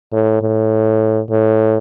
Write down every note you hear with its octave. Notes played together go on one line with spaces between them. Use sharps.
A2
A2
A2